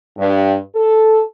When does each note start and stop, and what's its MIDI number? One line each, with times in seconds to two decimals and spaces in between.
0.18 0.56 43
0.75 1.22 69